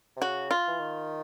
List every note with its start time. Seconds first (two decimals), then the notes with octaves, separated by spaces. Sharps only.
0.17 C3
0.21 C#3 F#4
0.51 F4
0.67 E3
0.80 D#3